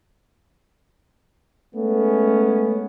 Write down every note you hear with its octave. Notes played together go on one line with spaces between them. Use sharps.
G#3 A3 B3 C#4